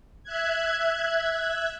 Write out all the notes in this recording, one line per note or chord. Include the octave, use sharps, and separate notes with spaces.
E5 F#6 G#6